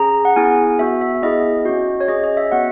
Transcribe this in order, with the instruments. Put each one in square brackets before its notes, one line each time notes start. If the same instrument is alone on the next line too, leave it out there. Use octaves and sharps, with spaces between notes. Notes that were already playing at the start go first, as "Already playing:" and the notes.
Already playing: [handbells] C#4 G#4 A#5
F#5
B3 E4 G#4 G#5
B3 F#4 E5
E5
B3 E4 G#4 D#5
C#4 F#4
C#5
C#4 G#4 D#5
D#5
E5
B3 F#4 F#5